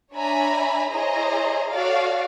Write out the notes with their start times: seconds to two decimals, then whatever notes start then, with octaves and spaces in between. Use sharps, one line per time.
0.14 D4 C#5 E5 G#5 A#5 B5
0.91 E4 G#4 C5 C#5 D#5 A#5
1.72 F#4 A4 C#5 D5 F5